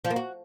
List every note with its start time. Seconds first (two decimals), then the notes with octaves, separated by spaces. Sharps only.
0.05 F3
0.10 A#3
0.16 F#4